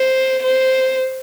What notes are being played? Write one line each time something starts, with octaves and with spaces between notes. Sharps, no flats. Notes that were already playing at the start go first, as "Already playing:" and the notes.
Already playing: C5
C5